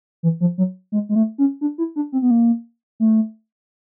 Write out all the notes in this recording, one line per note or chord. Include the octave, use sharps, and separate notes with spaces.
E3
F3
F#3
G#3
G#3
A3
C#4
D4
E4
D4
C4
B3
A#3
A3